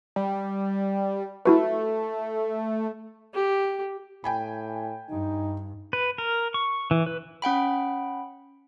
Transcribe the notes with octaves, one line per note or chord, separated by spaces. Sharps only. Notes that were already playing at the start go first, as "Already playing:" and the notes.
G3
A3 E4 F#4 B4
G4
A2 G5 G#5 B5
G2 D#4
B4
A#4
C#6
E3
B4
C#4 F#5 G5 B5